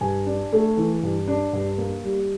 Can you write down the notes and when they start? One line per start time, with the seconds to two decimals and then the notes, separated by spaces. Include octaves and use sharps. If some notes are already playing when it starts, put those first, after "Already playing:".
0.01 G2 G#5
0.26 D4
0.53 A3
0.77 E3
1.03 G2
1.28 D4
1.53 G2
1.78 A#3
2.04 G3